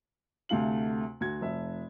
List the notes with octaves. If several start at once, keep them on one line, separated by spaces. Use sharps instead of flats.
D2 C3 A3 F5 F#7
D2 F#4 G#6
F1 E5